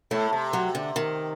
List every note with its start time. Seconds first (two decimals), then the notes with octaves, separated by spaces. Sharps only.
0.11 A2 A3
0.33 C3
0.53 F#3
0.75 D3
0.96 D#3